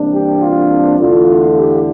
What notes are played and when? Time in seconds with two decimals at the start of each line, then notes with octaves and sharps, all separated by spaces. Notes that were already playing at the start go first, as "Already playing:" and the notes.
Already playing: C2 C3 E3 A#3 D4
0.11 G4
0.41 F4
0.99 E2 D3 A3 E4 F4
1.58 G4